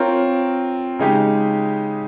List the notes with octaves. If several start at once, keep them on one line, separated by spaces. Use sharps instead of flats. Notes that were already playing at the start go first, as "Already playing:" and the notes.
Already playing: C4 F4 A#4 C#5
C#3 G#3 D#4 G4